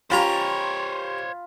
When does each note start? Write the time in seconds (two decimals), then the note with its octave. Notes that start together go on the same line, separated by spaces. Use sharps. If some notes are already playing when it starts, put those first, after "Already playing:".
0.10 C#4 F4 G4 C5 C#5 A#5 B5